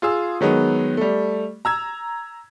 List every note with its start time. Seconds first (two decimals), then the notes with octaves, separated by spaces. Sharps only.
0.02 F4 G#4 E6
0.41 D#3 F#3 G#3 B3
0.97 G3 A3
1.65 A#5 E6 G#6